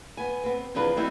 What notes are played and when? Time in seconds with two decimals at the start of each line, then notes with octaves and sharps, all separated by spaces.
0.17 B3 G#5
0.44 B3 C4
0.75 E2 C3 F3 D4 G#4 B4
0.96 F#3 G3 C4 D#4 E4